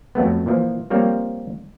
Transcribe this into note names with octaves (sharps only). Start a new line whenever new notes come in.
F2 F#3 A3 B3
A#2 E3 F3
F3 G3 A#3 C4 C#5